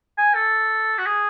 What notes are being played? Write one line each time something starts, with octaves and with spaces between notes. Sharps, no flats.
G#5
A4
F#4
G#4